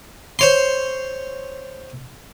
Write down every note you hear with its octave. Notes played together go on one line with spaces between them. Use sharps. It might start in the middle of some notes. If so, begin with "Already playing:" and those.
C5 C#5 C6